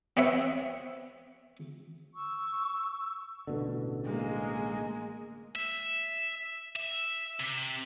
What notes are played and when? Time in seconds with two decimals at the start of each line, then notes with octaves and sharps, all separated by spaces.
0.17 B3 C4 C#5 E5 F#5
2.14 C#6 E6
3.47 A1 B2 D3
4.05 G#3 A#3
5.56 E5
6.76 E5
7.40 C3